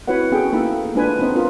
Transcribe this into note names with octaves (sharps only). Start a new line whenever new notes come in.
C4 E4 F#4 B4 C#5 F#5
B3 C#4 F#4 G#4 A4 G5
A#3 D#4 E4 A4 B5
G#3 A#3 D4 F4 B4 G#5
B3 C4 D#4 C5 D#5
D#4 F4 A#4 B4 D#5